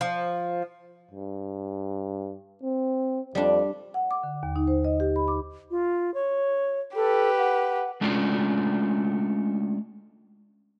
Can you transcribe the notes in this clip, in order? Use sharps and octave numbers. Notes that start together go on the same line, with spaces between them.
F3
G2
C4
F2 G3 D4
F#5
D6
D3
D#2
D#4
C5
D#5
G4
B5
D6
F4
C#5
G4 A4 B4
F#5
G#3 A3 C#4 D4 E4 F4